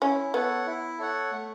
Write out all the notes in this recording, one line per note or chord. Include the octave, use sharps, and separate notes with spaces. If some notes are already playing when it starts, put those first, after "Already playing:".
C#4 E4
B3 A4 C#5 F#5
E4
A4 C#5 F#5
A3